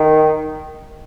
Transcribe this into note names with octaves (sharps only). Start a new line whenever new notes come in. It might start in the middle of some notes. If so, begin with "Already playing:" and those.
Already playing: D#3